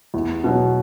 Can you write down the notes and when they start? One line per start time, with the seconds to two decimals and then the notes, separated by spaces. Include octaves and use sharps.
0.14 E2
0.44 B2 F#3